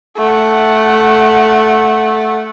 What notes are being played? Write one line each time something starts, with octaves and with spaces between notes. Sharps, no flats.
A3 F#5